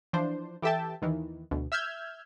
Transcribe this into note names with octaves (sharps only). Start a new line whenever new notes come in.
E3 F3 D4 C5
E3 G4 A4 E5 G5 A5
D#2 D#3 E3
D2 B2
E5 E6 F6 G6 G#6